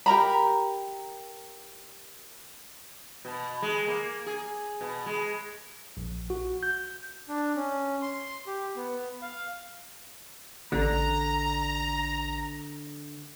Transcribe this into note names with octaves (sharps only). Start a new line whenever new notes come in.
G4 A#4 A#5 B5
B2
G#3
A#3
G#4
B2
G#3
A#1
F#4
G6
D4
C#4
C6
G4
B3
F5
A1 D3 D4 A#5